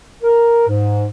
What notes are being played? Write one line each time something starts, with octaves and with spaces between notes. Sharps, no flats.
A#4
G#2